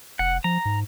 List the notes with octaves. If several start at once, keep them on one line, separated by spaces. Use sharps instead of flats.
F1 F#5
F3 A#5
G#2